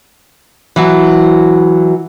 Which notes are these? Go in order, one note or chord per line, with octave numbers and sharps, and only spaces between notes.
E3 F#3